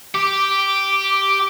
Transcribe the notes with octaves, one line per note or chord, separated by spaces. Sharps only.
G4 D6